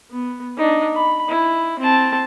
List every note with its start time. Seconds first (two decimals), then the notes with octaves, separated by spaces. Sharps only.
0.11 B3
0.57 D4 D#4
0.95 B5
1.28 E4
1.79 C4 A5